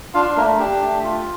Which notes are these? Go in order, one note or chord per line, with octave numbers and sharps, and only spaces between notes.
D4 F4 F5
A3 A#3 A#4
D4 G4
A3
F4